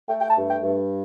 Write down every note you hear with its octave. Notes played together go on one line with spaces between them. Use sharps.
A3 G5
G5
A5
G2
G5
G2